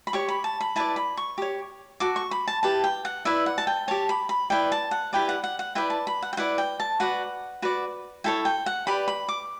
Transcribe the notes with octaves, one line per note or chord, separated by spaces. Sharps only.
B5
G4 C#5 C#6
B5
A5
B5
E4 B4 D5 A5
B5
C#6
G4 C#5
F#4 A4 D6
C#6
B5
A5
E4 G4 B4 A5
G5
F#5
E4 B4 D5 E5
F#5
A5
G5
G4 C#5 A5
B5
B5
E4 B4 D5 G5
A5
F#5
E4 G4 B4 D5 G5
F#5
F#5
F#5
E4 B4 D5 G5
A5
B5
F#5
G5
E4 B4 D5 F#5
G5
A5
F#4 B4 D5 F#5
F#4 B4 D5
E4 A4 C#5 G5
G5
F#5
G4 B4 D5 B5
B5
D6